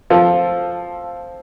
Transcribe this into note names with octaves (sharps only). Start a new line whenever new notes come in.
F3 C4 F4 A4